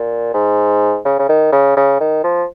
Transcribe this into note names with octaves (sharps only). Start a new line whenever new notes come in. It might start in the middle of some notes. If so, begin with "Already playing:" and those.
Already playing: A#2
G#2
C#3
C#3
D#3
C#3
C#3
D#3
F3